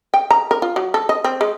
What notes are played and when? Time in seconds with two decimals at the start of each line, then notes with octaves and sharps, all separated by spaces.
0.14 G5
0.31 A#5
0.51 A#4
0.62 F4
0.76 F#3
0.94 A4
1.09 D#5
1.24 C4
1.41 G#3